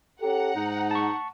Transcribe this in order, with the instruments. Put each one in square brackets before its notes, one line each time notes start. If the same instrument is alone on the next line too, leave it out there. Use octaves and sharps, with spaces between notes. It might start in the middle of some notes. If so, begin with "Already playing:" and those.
[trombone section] C#4 G4 A4 [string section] F#5 A#5
[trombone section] G#2 [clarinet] D#4
[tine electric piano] A5 C#6